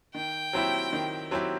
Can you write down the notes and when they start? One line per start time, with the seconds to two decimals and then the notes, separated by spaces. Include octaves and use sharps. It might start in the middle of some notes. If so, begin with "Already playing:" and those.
0.15 D#3 G5
0.53 F#3 C4 E4 G4
0.93 D#3
1.31 F#3 C4 E4 G4